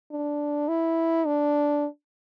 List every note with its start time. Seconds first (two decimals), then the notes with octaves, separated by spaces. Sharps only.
0.12 D4
0.69 E4
1.27 D4